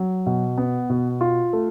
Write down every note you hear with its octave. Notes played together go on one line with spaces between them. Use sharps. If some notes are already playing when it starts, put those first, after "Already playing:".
Already playing: F#3
B2
B3
B2
F4
A3